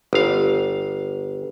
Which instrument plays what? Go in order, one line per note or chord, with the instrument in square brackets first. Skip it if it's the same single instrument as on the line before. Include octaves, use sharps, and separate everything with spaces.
[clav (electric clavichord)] G1 F5